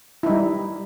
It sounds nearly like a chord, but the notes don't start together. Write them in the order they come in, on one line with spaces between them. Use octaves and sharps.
E4 D#4 G3